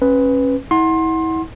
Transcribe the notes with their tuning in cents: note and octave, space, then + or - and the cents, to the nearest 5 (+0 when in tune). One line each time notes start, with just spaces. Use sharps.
C#4 -30 B4 +0
E4 -35 F#5 +0 C6 +25